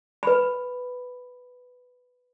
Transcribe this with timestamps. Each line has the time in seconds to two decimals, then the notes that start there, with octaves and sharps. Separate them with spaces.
0.23 B4 B5